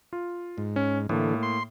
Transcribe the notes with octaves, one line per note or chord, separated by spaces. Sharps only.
F4
G#2
C#4
A2 D3 E3 A3 A#3
C6